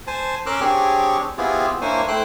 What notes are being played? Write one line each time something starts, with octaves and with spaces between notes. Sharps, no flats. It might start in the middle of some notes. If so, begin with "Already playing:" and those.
C5 G#5 A5
C#4 A#4 C6 D6 E6 F#6
C4 D4 G4 G#4 C#5
B3 C4 E4 F4 G4 G#4
A#3 D4 E4 C5 C#5 G#5
A3 E4 C5 G5 C6 F#6